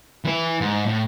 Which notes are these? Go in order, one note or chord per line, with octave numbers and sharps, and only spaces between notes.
E3 B4
G#2
A2